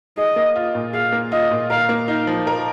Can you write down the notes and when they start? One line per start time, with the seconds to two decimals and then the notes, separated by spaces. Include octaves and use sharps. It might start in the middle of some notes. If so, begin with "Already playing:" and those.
0.17 G#4 D#5
0.36 A#3
0.56 F4
0.75 A#2
0.93 G#4 F5
1.12 A#3
1.32 F4 D#5
1.51 A#2
1.70 A#4 F5
1.89 A#3
2.08 D#4 F5
2.27 F3
2.47 A#4